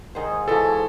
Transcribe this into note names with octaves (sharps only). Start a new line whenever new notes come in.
G#2 D#3 G#4 C5
E3 F3 F#4 A4